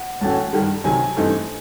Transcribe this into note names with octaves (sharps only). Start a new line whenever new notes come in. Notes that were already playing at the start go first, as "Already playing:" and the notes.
Already playing: F#5
A2 E3 A3 C#4 F#4 A5
G2 D#3 G3
C3 D#3 F#3 G#5
G2 E3 A3 C4 D#4